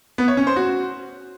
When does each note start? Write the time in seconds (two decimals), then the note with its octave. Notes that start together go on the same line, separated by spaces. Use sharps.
0.18 B3
0.28 C#5
0.37 C#4
0.47 C5
0.56 F#4